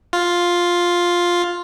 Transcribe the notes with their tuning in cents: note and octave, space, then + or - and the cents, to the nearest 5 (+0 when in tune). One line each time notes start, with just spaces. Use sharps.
F4 +5